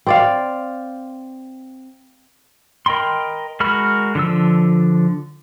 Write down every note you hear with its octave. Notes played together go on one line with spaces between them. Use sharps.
C4 D5 F5
A#4 D#5 G5 B5 C6
G#3 F#4 A#4 B5 F6
D3 F3 E6